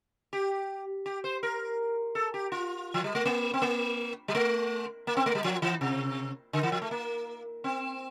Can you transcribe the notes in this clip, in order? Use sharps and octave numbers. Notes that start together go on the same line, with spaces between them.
G4
G4
C5
A#4
A4
G4
F4
F3
G3
A3
A#3
C4
A#3
G3
A3
A#3
C4
A3
G3
F3
E3
C3
D3
E3
F3
A3
A#3
C4